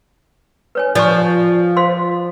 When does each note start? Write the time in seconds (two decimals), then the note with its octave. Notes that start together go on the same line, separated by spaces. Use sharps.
0.75 B4 C#5 G#5
0.95 F3 D5 G#5 C#6
1.77 C5 F5 C6